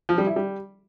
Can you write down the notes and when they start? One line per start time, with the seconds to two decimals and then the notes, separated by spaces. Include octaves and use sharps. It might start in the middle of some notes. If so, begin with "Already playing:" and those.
0.09 F3
0.18 G3
0.27 E4
0.36 G3